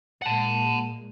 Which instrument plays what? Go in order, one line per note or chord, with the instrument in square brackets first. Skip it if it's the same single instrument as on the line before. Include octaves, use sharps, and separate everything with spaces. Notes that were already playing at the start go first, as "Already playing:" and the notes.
[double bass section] A#2 G#3 A#3 [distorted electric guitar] F#5 A5